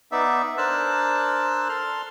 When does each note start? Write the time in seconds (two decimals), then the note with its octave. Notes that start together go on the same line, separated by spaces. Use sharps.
0.12 B3 D#4 D5 E5
0.58 D4 A#4 C5 A5 E6 F#6
1.69 A4 C6 F6